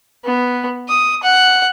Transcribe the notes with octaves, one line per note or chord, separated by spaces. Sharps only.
B3
D#6
F#5